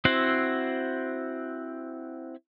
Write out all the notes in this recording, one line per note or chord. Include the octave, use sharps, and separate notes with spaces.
C4 E4 F#4 C5 F#5